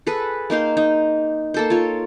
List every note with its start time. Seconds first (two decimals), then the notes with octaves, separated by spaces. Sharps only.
0.07 G#4 A4 B4
0.50 A#3 D#4 C5 F5
0.77 D#4
1.54 A#3 A4 C5
1.70 F4 C#5